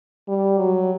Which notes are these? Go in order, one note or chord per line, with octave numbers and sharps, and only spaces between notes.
G3
F#3